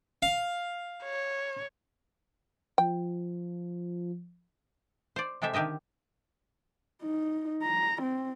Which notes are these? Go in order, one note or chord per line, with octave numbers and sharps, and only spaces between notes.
F5
C#5
F3 G5
C5 D5
C3 G#3 G4 A4 E5
D3 D#3 G4 D#5 E5
D#4
A#5
C4